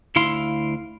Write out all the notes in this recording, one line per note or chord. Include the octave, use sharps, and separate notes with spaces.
D2 E4 F5 C6